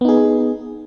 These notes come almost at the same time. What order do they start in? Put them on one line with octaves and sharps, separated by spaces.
B3 D#4 G#4